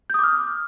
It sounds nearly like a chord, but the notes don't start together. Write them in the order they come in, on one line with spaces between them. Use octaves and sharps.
G6 D#6 D6 F6